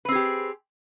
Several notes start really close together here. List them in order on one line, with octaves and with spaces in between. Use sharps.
B4 C4 G#4 G4